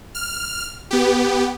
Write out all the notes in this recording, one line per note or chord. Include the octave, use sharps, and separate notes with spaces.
F6
B3 G4